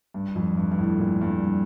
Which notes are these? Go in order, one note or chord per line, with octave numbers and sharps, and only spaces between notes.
G2
F2
G2
G2
A2
A#2
G2